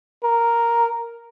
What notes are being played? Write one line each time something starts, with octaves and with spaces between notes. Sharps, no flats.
A#4